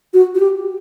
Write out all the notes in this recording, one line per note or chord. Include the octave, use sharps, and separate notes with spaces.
F#4
F#4
G4